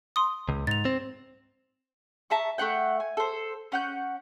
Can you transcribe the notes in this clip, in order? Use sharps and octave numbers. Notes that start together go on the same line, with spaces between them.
C6 D#6
C#2
G#2 A6 F7
C4
E5 A5 A#5 C#6
A3 C#4 F#5 G5
G#5
A4 C5
C#4 F#5 G6